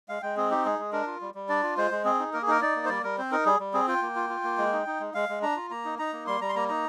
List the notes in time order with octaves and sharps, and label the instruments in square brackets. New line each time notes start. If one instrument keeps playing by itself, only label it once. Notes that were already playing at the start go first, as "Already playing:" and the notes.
[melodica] G#3 F5
G#3 G5
C4 G#4
D#4 G4
G#3 G#4
G#3
D4 A#4
F4
G3
G3
D4 D5
F4
G#3 C5
G#3
C4 G#4
D#4
A#3 A#4
G#4
D#4 A#4
D#4 D5
A#3
C5
G3 D5
G3 A#4
C4 C5
D#4 A#4
G3 G#4
G3
C4 G#4
F4 G5
A#3
F4
F4
A#3
G#3
D#4
D#4
G#3
G#3 F5
G#3
D4 A#5
F4
A#3 A#5
D#4
D#4 A#5
A#3
G3 C6
G3 A#5
C6
A#3 A#5
D#4 A#5